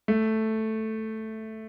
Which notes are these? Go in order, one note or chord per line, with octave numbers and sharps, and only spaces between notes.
A3